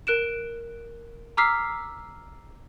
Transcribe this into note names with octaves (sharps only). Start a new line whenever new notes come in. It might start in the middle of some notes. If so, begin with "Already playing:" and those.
A#4 F#6 D7 E7
A#5 D6 E6 F6 B6 C7